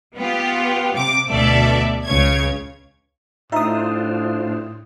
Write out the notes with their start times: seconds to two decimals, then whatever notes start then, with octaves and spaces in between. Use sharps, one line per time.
0.16 B3 F4 G4
0.95 C3 D6
1.28 D2 B2 A4 D5 E5
2.06 C#2 C#3 C#5 G#6
3.52 A2 D4 D#4 F4 C5 E5 D#6